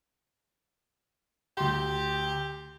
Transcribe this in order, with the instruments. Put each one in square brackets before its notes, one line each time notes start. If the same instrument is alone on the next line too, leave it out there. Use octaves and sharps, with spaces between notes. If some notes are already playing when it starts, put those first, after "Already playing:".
[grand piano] D2 C6 [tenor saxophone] G4